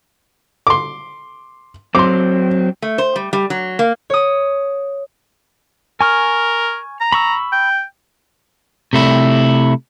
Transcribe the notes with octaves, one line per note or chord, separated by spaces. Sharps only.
C6 D6
F#3 C4 C6 D6
A3
C5
G3
G3
F#3
A#3
C#5 D#6
A#4 G#5 C#6 F6
A#5
B5 C#6 E6
G5
C3 A3 E4